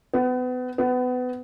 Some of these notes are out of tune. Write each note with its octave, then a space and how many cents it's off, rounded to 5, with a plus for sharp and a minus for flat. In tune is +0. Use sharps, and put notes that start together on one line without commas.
B3 +30
B3 +25